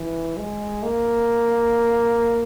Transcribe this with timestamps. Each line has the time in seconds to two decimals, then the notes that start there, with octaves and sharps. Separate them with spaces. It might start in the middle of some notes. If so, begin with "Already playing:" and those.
Already playing: E3
0.37 G#3
0.83 A#3